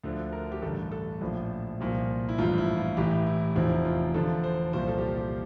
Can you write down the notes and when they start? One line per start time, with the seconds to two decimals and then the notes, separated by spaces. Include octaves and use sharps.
0.04 D2 D3 F3
0.33 A#4
0.52 G4
0.62 A1 G2 D3 A4
0.91 A4
1.21 A#1 A2 F3
1.80 C2 A#2 F3
2.29 E4
2.38 A1 G2 F3 F4
2.58 E4
2.78 F4
2.97 A1 A2 E3 G4
3.27 E4
3.56 F1 E2 C3 F3 E4
3.85 F4
4.14 E2 D3 F3 A4
4.44 C5
4.73 C2 A#2 F3 C5
4.88 A4
4.98 G4
5.03 F4
5.17 G4